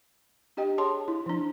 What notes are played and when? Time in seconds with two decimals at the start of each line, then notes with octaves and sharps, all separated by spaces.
0.57 D4 G4 D#5 G5
0.78 G#4 C#5 A5 C6
1.08 E4
1.26 F3 D4